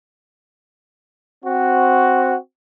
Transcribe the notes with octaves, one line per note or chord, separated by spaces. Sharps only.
C4 F#4